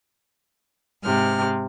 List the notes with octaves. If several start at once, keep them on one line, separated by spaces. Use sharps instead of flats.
G#2 C3 F6